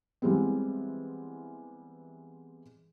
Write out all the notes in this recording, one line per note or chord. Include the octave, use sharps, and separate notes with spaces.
E3 G3 G#3 B3 C4